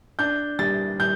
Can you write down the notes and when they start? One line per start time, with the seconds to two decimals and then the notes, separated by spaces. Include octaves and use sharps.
0.19 D4 G6
0.59 G3 A6
1.00 G3 G6